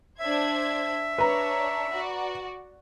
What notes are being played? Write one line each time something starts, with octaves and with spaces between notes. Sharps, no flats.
D4 C5 E5 G#6
D4 B4 C#5 A#5
F#4 D5